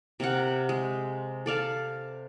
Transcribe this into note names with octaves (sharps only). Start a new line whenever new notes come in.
C3 C4 A#4 F#5
G#3
A4 D5 F5 A5